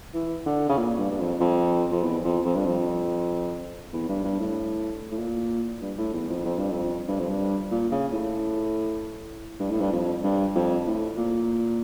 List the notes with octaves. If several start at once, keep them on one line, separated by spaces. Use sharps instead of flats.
E3
D3
C#3
A#2
G2
G2
F2
F2
F2
E2
F2
F2
G2
F2
E2
G2
G2
A2
A2
A#2
G2
A2
E2
F2
F2
G2
F2
G2
F2
G2
A#2
C#3
A2
G2
A2
G2
F2
G2
F2
A2
A#2